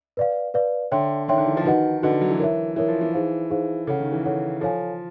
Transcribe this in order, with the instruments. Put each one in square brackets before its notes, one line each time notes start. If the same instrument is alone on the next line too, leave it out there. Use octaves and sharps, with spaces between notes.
[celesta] B4 D5 F5
B4 D5 F5
[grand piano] D3 [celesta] C#5 E5 G5 C6
[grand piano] D#3 [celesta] C#5 E5 G5 C6
[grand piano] D3
E3
F3
[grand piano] D#3 [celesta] D#4 F#4 B4 D#5 F#5
[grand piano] D3 [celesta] D#4 F#4 B4 D#5 F#5
[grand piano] D#3
F#3
E3
[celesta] A#4 C#5 E5
[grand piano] E3 [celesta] A#4 C#5 E5
[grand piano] F3
E3
[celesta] D#4 G#4 C5 F5
D#4 G#4 C5 F5
[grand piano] C#3 [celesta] A4 C#5 F#5
[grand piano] D#3
E3
[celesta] A4 C#5 F#5
[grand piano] F3 [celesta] A4 C#5 F5 G#5